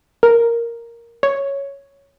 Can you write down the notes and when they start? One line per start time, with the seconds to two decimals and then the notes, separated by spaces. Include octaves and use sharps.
0.23 A#4
1.23 C#5